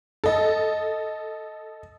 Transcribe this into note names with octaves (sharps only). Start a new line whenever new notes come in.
A4 D#5